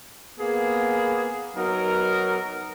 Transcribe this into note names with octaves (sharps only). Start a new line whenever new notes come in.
A#3 B3 G#4
F#3 B3 D#4 A#4